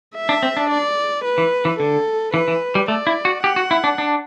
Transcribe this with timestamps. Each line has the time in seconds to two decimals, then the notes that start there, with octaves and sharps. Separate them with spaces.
0.15 E5
0.29 D4
0.43 C4
0.57 D4
0.70 D5
1.24 B4
1.38 E3
1.65 E3
1.79 D3 A4
2.33 E3 B4
2.48 E3
2.75 G3
2.88 A3 D5
3.07 E4
3.25 F#4
3.43 G4 F#5
3.56 F#4
3.71 E4
3.84 D4
3.98 D4